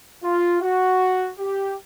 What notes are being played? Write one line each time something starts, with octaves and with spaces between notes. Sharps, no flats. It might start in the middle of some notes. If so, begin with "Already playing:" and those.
F4
F#4
G4